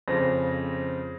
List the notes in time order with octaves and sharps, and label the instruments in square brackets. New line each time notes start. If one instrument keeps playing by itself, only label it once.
[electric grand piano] F2 C#3 [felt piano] C5 A#6